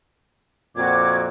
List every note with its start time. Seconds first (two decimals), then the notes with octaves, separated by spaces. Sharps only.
0.76 F2 A#2 C4 F#4 D6 G#6